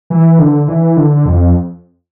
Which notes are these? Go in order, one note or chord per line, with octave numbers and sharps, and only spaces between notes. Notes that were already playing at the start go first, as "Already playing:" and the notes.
E3
D3
E3
D3
F2